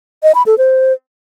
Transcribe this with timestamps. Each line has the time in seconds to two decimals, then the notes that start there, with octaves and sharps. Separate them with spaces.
0.23 D#5
0.35 B5
0.46 A4
0.58 C5